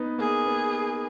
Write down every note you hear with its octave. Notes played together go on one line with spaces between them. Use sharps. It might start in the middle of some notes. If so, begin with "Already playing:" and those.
Already playing: B3 D#4
A#3 G#4
B3